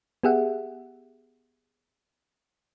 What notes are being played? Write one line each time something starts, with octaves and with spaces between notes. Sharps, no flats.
B3 G4 G#4 E5 F#5